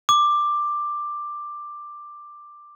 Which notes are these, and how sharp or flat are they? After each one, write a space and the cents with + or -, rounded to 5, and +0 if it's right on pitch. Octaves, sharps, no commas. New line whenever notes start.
D6 +10